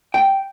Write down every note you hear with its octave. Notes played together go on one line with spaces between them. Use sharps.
G5